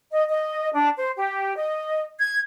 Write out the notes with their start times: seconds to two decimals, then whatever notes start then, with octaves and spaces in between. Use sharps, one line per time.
0.11 D#5
0.28 D#5
0.73 D4
0.97 C5
1.17 G4
1.56 D#5
2.19 G#6